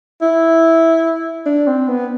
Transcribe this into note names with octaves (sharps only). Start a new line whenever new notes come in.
E4
D4
C4
B3